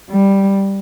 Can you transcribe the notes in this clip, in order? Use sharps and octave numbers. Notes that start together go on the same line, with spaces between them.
G3